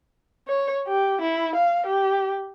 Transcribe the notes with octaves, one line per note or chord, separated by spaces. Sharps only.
C#5
G4
E4
F5
G4